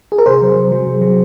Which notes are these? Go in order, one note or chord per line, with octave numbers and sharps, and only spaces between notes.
G#4
A#4
C3 G#4 C5
F#3
C3
F#3
C3
F#3